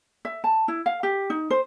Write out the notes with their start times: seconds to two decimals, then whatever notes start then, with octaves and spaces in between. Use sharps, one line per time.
0.25 E5
0.44 A5
0.68 E4
0.86 F5
1.03 G4
1.30 D#4
1.50 C5